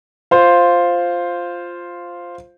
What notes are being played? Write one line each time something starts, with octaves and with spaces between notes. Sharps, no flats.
F4 C5 F5